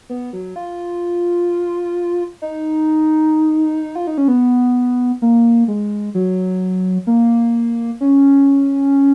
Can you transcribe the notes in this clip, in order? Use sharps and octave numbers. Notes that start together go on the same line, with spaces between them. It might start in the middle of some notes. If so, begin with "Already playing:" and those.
B3
F#3
F4
D#4
F4
D#4
C#4
B3
A#3
G#3
F#3
A#3
C#4